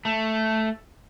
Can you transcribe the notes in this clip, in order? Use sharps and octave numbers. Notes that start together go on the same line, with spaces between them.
A3